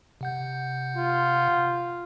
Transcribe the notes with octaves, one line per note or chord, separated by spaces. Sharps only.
C3 F#5 G6
F4